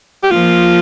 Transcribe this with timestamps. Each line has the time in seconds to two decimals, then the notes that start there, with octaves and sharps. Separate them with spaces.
0.23 G4
0.31 F3 A#3 F4